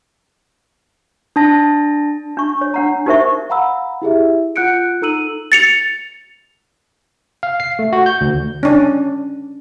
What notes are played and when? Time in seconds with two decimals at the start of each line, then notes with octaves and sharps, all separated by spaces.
1.36 D4 A5 A#6
2.37 D4 C#6
2.61 C#5
2.74 D4 F#5 A#5
3.06 D#4 G4 A#4 C5 E5 C#6
3.50 F5 F#5 A#5 B5 E6
4.02 E4 G4 G#4 E5
4.56 F4 F#5 F#6 G6 C#7 D7
5.02 D#4 A4 A#5 E6 D#7 F#7
5.52 A6 C#7 F7
7.43 F5
7.60 C7
7.79 A3
7.93 F#4
8.06 G6
8.21 D2
8.63 C#4 D4